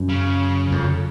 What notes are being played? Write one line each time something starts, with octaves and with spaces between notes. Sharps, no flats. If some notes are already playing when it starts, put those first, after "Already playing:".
Already playing: F#2
C#3
F2